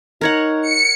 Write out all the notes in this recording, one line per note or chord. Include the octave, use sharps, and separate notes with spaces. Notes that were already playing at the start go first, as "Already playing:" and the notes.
D#4 A#4 C#5 F#5
C#7